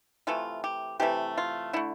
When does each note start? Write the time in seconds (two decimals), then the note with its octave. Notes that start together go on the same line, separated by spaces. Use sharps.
0.27 C3 E3 A3 F4
0.64 G4
1.00 C3 E3 A3 G4
1.38 F4
1.73 D3 A3 E4